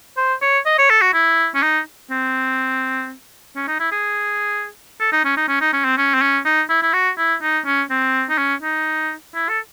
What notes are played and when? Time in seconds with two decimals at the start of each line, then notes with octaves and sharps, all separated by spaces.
0.17 C5
0.42 C#5
0.66 D#5
0.79 C#5
0.90 A4
1.02 F#4
1.14 E4
1.55 C#4
1.63 D#4
2.11 C4
3.56 C#4
3.68 D#4
3.80 E4
3.92 G#4
5.00 A4
5.12 D#4
5.25 C#4
5.37 D#4
5.48 C#4
5.61 D#4
5.73 C#4
5.85 C4
5.98 C#4
6.14 C4
6.21 C#4
6.45 D#4
6.70 E4
6.82 E4
6.93 F#4
7.18 E4
7.42 D#4
7.66 C#4
7.90 C4
8.29 D#4
8.38 C#4
8.62 D#4
9.35 E4
9.49 A4